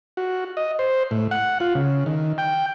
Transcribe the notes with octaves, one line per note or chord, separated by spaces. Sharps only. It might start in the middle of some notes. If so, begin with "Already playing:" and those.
F#4
D#5
C5
A2
F#5
F4
C#3
D#3
G5